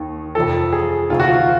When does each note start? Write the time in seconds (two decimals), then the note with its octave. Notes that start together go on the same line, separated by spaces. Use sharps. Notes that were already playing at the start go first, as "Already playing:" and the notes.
Already playing: D#2 D#3
0.35 F2 C3 F3 A4
0.73 G#4
1.09 D2 C3 D#3 F4
1.20 F#4
1.28 F4